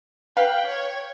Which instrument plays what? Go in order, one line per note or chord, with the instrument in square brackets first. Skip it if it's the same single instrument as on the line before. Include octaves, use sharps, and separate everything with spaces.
[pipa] B4 [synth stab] F5 [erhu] G5
[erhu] C#5